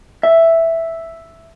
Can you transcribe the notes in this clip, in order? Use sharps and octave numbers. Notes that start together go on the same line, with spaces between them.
E5